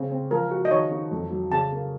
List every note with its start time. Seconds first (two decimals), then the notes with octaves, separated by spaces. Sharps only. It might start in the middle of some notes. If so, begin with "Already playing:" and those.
Already playing: C#3 C4
0.11 C4
0.31 F3 A#4
0.51 F#4
0.65 D#5
0.70 D#3 C#5
0.91 D#4
1.11 F2
1.31 F#3
1.51 C#3 A5
1.72 A#3